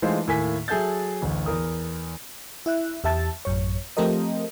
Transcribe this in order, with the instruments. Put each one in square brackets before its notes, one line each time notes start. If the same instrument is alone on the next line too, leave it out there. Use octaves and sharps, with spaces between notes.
[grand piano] E3 G#3 A3 D#4 F4 C5
D#2 A2 A#3 G#5 B6
F#3 G#4 A4 E5 G6 A6
A1 D2
E2 A#4 D#6
[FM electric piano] E4 E5 F#6
E2 G4 E5 A5 A6
A1 F#2 C#5
F3 A3 C4 G4 A#4 D#5